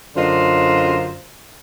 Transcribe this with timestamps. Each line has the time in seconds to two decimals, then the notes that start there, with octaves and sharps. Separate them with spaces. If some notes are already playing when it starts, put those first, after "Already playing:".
0.16 F#2 D3 F4 C5 D5 D#5